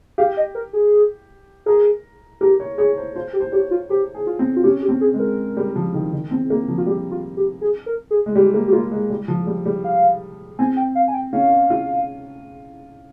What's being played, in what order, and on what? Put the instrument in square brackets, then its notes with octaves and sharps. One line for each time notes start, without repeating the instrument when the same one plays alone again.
[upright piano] G4 [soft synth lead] F5
[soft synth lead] D#5
A#4
G#4
[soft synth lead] G#4 [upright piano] A#4
[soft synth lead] G4 [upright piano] A#4
[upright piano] C#5
[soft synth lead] G#4 [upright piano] C#5
[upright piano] C5
[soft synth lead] F4 [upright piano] C5
[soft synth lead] G4
[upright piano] C5
[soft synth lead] G4 [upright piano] C#5
[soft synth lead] F4
[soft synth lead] G4 [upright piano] C5
[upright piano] G#4
[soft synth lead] F4
[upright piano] C4
[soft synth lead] F4
[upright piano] C#4 [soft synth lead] G4
[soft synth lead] G4
[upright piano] C4
[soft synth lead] G#4
[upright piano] G#3
[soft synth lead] A#4
[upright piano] G3
F3
D#3
D#3
C4
A#3
F3
[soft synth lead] F4
[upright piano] G3 [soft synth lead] G4
[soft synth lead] F4
G4
G#4
A#4
G#4
[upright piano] G#3
[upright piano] G3 [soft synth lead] G4
[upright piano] A#3
[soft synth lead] G4
[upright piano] A#3 [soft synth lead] F4
[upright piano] G#3
G3
F3
G3
G3
[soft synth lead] F5
[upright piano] C4 [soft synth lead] G#5
[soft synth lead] G5
F5
G#5
G5
[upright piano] C#4 [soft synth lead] F5
[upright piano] F4